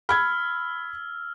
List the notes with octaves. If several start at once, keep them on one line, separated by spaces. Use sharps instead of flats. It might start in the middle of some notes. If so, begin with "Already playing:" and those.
B5 E6 F6 G#6